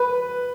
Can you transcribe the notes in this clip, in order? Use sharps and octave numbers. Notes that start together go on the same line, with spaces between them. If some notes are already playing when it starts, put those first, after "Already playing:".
Already playing: B4